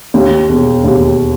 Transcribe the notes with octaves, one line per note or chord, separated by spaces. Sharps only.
D#2
E1
D#2